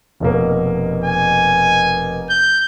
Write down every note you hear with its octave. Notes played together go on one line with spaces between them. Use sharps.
F1 B2 A#3
G#5
G6